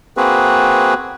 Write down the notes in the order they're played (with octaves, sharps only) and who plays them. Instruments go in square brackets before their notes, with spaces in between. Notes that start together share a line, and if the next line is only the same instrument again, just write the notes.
[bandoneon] A#3 C4 F#4 G#4 B4